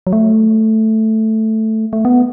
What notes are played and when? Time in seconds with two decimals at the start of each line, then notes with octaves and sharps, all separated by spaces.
0.07 F#3
0.13 A3
1.93 A3
2.05 B3